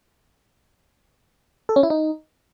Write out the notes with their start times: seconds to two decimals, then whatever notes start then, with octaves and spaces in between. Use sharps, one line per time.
1.69 A4
1.76 C#4
1.83 E4
1.90 D#4